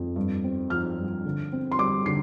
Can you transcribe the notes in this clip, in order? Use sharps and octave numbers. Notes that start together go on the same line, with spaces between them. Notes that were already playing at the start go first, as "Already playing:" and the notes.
Already playing: F2
G2
C4
F3 F6
G2
D3
C4
C6
G3 D6
D3 C7